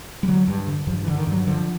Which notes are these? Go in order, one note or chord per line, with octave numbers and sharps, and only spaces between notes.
G3
D3 F#3
G2
D3
G2 F3
E3
D3
D#3
G2
F#3
D3 F3